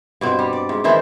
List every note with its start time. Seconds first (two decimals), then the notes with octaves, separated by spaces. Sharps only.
0.21 G2 B2 C4
0.39 G3
0.53 D5
0.69 G#2
0.84 D#3 E3 E4 C5